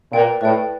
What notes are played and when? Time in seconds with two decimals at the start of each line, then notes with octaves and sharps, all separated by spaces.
0.12 A#2 B4 D5 G5
0.41 A2 B4 D5 G5